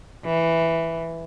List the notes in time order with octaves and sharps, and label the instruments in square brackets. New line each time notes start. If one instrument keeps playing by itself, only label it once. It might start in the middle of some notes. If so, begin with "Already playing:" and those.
[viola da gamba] E3